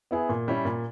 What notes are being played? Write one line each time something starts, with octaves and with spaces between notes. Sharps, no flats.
B3 E4 G#4
A#2
G3 C#4 E4
A#2